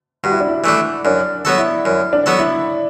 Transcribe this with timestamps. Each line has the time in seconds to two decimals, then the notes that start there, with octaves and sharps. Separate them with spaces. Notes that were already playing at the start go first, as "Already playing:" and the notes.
0.24 G2 F#4
0.31 E4
0.40 D4
0.48 E4
0.64 E3 A3 D4
1.05 F#2 D4
1.45 F#3 B3 F#4 A4
1.58 E4
1.85 F#2
2.13 D4
2.26 F#3 B3 F#4 A4
2.39 E4